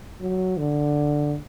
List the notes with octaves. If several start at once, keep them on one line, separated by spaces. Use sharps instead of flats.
F#3
D3